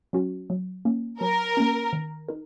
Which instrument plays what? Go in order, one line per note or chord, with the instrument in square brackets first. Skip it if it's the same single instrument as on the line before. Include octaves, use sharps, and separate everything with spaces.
[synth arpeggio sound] F#3 C#4 F#4
F#3
A#3 C#4
[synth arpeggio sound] F#3 [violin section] A#4
[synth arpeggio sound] A#3 C#4
D#3
D#4 A#4